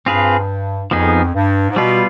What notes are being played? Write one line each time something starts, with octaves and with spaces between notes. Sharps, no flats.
G2 C4 F4 G#4 B4
F2 F3 B3 D#4 G#4
G2
G#2
B2 G3 B3 F4 B4